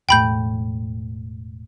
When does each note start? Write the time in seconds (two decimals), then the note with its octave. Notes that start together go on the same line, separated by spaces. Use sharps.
0.09 E1 A2 G5 B5 G6